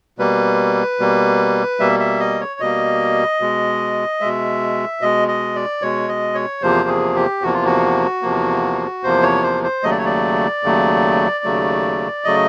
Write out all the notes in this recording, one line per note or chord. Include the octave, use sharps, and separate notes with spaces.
B2 G3 A#3 B4
B2 G3 A#3
B2 G3 A#3 E5
E5
D#5
C#5
B2 G3 A#3 D#5
B2 G#3
B2 G#3 E5
B2 G#3 D#5
D#5
D5
B2 G#3 C#5
D#5
C#5
E2 C3 F3 A#3 C5
G#4
G4
E2 C3 F3 A#3 F#4
F4
F#4
E2 C3 F3 A#3
E2 C3 F3 A#3 C5
C#5
C5
C5
D#2 C#3 F#3 A3 D#5
D5
C#5
D5
D#2 C#3 F#3 A3
D#2 C#3 F#3 A3
C#3 F#3 A3 D#5